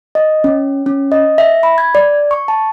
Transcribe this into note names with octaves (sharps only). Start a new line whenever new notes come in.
D#5
C#4
C#4
D#5
E5
B5
G#6
D5
C#6
A5